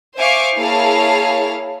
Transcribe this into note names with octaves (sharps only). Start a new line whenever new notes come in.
C5 E5 F5 G#5 C#6 D6
A#3 E4 G#4 C#5 F5 A5